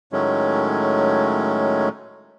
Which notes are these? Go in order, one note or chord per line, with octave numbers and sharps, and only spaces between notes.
A2 D#3 F#3 G#3 A3 C#4